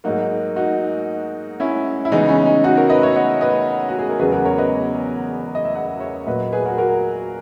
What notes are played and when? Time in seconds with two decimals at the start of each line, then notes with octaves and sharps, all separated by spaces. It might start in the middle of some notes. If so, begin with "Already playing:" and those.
0.04 G#2 F#3 A#3 D#4 F#4
0.56 D#4 F#4
1.60 C#4 E4
2.05 E4
2.12 C#3 E3 G#3 B3 D#4
2.29 C#4
2.46 D#4
2.64 D#4 F#4
2.77 A#4 C#5
2.90 B4 D#5
3.02 C#5 E5
3.16 D#5 F#5
3.41 B4 D#5
3.88 F#4
3.99 G#4
4.10 A#4
4.19 E2 C#3 F#3 B3 G#4 B4
4.32 F#4 A#4
4.45 A#4 C#5
4.58 B4 D#5
5.55 D#5
5.65 E5
5.74 D#5 F#5
6.00 C#5 E5
6.26 A#2 F#3 A#3 B4 D#5
6.52 G#4 B4
6.66 F#4 A#4
6.78 F#4 A#4